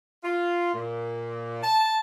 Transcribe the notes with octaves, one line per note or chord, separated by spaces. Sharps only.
F4
A#2
A5